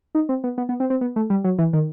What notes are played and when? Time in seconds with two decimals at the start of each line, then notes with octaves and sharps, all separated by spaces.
0.15 D#4
0.29 C4
0.44 B3
0.58 B3
0.69 B3
0.80 C4
0.90 C4
1.01 B3
1.16 A3
1.30 G3
1.44 F#3
1.58 E3
1.73 D#3